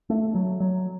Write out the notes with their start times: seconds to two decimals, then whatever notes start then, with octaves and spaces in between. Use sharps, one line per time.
0.10 A3
0.35 F#3
0.60 F#3